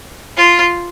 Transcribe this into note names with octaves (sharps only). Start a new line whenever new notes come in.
F4